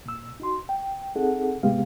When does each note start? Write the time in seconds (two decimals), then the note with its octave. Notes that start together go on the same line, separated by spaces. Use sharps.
0.06 A#2 E6
0.40 D#4 F#4 C6
0.69 G5
1.16 C4 D#4 G#4 A4 F#5
1.63 A2 C3 G#3 B3 G4 F5